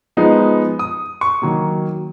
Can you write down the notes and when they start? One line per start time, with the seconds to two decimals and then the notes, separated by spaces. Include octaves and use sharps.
0.17 F3 G#3 B3 D#4
0.79 D#6
1.21 C#6
1.42 D#3 F#3 A#3